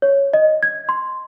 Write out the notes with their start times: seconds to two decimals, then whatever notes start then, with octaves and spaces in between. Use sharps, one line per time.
0.02 C#5
0.33 D#5
0.63 G#6
0.89 C6